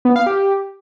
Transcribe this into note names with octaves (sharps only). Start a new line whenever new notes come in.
B3
F5
G4